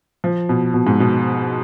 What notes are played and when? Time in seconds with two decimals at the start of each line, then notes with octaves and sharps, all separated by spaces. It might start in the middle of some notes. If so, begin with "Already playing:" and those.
0.24 F3
0.49 B2
0.74 B2
0.87 G#2
1.00 B2